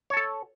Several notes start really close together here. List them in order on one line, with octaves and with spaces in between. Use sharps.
C#5 A5 A4